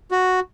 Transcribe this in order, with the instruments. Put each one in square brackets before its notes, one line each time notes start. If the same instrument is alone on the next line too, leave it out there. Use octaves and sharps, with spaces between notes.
[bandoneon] F#4